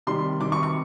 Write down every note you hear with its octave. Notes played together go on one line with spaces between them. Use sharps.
C3 D#3 G3 C6
C3 D#3 G3 D6
C#6
C#6